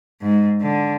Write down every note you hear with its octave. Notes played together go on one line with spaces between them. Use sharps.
G#2
D3